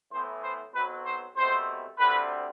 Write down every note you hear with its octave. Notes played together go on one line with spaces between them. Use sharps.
A2 E3 B3 C5
C5
B1 B2 F#3 C4 B4
C5
C2 B2 A3 C4 C5
D2 D3 G3 C4 B4